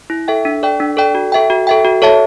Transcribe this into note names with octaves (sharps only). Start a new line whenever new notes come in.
E4
A4 E5 G5
D4
A4 D5 G5
D4
A4 D5 G5
F#4
A4 E5 G5
F#4
A4 E5 G5
F#4
A4 C#5 E5 A5